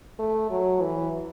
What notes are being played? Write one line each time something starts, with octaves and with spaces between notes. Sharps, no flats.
A3
F#3
E3